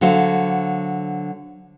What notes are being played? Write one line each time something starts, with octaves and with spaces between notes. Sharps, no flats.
D3 F#3 C5 F5